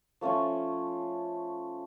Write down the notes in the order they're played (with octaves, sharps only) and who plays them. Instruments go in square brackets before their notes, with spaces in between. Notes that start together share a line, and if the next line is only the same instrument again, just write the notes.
[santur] F3 A3 C#4 F4